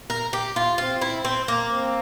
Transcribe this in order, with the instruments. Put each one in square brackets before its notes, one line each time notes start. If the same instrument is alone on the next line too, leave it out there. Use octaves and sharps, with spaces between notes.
[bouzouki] A#4
G4
F4
[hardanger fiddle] C4 [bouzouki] F4
[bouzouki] E4
C4
A#3
[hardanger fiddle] C4